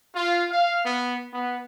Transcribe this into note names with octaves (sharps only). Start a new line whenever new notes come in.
F4
F5
B3
B3